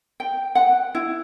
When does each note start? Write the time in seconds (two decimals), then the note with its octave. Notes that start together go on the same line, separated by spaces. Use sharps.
0.20 G5
0.55 F#5
0.95 E4